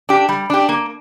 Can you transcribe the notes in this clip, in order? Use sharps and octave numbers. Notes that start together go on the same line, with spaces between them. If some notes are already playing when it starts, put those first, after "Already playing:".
D4 G4
G3
D4 G4
A#3